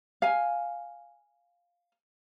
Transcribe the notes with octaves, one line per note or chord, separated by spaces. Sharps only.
F5 G#5